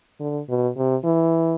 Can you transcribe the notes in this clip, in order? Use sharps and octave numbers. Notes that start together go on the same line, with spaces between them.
D3
B2
C3
E3